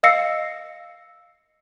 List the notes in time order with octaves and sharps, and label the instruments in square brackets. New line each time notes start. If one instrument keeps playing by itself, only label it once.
[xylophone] D#5 F5 E6 A#6 C7 C#7